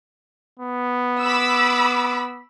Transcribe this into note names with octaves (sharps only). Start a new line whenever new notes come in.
B3
B5 D6 E6